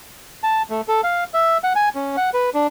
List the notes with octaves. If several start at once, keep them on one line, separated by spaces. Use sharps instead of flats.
A5
A3
A4
F5
E5
F#5
G#5
C#4
F#5
B4
D4